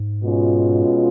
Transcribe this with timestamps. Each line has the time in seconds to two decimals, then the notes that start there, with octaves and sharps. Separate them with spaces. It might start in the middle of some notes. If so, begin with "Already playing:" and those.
Already playing: G#2
0.24 B2 G#3 C#4 F4